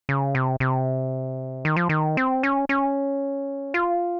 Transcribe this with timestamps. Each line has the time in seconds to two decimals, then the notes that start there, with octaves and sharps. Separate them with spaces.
0.09 C#3
0.35 C3
0.60 C3
1.65 D#3
1.76 F3
1.89 D#3
2.17 C4
2.43 C#4
2.69 C#4
3.74 F4